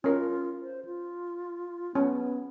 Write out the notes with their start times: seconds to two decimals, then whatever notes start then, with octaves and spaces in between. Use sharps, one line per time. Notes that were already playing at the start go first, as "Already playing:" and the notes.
0.04 C#4 F4 A#4
0.61 C5
0.85 F4
1.95 B3 C#4